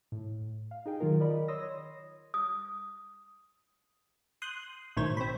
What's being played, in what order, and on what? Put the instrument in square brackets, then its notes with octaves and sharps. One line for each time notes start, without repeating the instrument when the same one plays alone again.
[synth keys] A2
F5
D#4 G#4 G5
D#3 F#3 F4 A#4
A#4 D5 D#5 B5
C#5 C6 D#6 E6 A#6
[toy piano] D#6
[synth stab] C6 D#6 F#6 G6
B1 A2 D#3 C5 C#5
C4 B5